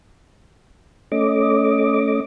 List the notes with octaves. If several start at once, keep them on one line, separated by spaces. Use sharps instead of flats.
A3 C#4 D#5 D6